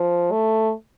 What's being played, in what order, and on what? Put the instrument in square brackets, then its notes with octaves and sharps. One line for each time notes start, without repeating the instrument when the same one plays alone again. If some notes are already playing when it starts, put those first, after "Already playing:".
Already playing: [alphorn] F3
A3